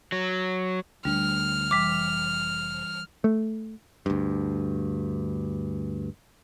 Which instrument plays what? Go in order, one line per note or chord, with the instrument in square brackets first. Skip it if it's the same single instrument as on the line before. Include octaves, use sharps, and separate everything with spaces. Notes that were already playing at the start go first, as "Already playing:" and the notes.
[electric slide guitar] F#3
[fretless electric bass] D2 D4 [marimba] G3 [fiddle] F6
[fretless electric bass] F1 [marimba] E3 G3 [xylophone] D6 B6
[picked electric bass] A3
D2 G2